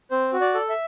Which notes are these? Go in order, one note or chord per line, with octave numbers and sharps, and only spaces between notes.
C4 C5
F#4
D5
A4
E5